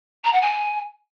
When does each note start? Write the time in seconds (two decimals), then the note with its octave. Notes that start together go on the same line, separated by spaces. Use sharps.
0.24 A#5
0.32 F#5
0.41 G#5